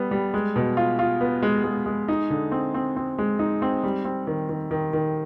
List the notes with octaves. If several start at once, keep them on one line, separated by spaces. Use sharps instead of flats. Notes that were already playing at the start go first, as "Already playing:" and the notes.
Already playing: G3 B3
G3
G#3
B2
F4
F4
B3
G#3
G#3
G#3
D#4
D3
C4
C4
C4
G#3
D#4
C4
G3
C4
D#3
D#3
D#3
D#3